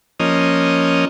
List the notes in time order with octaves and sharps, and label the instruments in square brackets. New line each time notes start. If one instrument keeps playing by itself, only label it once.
[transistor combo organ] F3 A#3 C#4 D#5